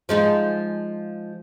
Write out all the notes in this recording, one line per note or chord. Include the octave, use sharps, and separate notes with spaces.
F3 G#3 D#4